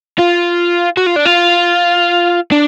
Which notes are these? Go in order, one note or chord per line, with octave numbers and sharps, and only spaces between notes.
F4
F#4
F4
D4
F4
D4